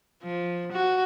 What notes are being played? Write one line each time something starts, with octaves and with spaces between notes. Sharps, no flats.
F3
F#4